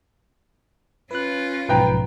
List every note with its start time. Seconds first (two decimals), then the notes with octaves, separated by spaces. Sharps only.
1.11 C#4 F4 B4 F#6
1.69 B1 G#2 F3 B4 G5 A#5